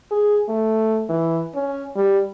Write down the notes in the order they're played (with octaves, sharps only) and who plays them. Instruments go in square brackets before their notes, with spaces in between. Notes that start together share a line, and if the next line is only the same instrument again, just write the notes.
[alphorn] G#4
A3
E3
C#4
G3